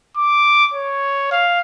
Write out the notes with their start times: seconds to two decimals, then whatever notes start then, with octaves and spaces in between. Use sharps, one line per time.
0.17 D6
0.74 C#5
1.32 F5